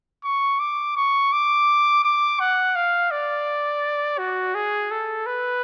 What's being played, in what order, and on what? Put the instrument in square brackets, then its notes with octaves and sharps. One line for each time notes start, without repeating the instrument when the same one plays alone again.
[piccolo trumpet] C#6
D6
C#6
D6
D6
F#5
F5
D5
F#4
G#4
A4
B4